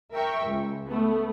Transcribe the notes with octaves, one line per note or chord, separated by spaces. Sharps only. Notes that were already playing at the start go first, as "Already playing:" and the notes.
A#4 E5 G5 C#6
C#2
A3 B3